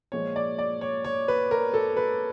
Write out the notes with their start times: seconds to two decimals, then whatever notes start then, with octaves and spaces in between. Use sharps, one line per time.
0.12 A#2 F3 G#3 C#5
0.36 D5
0.58 D5
0.81 C#5
1.05 C#5
1.28 B4
1.51 A#4
1.74 A4
1.97 B4